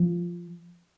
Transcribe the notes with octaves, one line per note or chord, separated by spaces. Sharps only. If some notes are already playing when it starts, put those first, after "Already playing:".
Already playing: F3